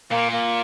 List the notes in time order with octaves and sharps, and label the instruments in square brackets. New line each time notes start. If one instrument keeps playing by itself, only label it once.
[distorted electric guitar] A#2 [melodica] A#3
[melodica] A#3